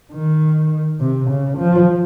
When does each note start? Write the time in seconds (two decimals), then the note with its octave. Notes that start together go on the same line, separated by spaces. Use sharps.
0.12 D#3
1.01 C3
1.29 C#3
1.58 F3